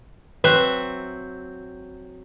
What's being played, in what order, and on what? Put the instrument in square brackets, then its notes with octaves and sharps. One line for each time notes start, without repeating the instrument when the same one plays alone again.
[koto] F#3 C4 E5 [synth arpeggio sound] B4 F#6